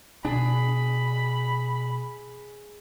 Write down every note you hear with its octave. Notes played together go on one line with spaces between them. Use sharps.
B2 D4 G#4 B5